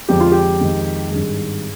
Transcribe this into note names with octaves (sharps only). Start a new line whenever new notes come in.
F2 D3 G#3 G4
F4
G4
F2 D#3 G#3
G#1 G2 D#3 G#4